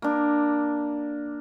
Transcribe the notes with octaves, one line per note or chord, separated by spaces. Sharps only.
A#3 D4